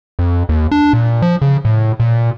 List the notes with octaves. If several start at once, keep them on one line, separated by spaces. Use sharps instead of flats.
F2
D#2
D4
A#2
F3
C#3
A2
A#2